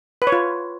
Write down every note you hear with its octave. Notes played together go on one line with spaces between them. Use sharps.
B4
C#5
F4